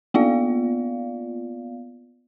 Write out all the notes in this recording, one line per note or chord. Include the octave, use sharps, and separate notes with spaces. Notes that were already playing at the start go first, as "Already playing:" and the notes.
A#3 B3 F4 D5 F5